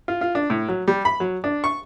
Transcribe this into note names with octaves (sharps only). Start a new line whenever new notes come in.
F4
F4
D4
A2
F#3
G3
B5
F#3
D4
C#6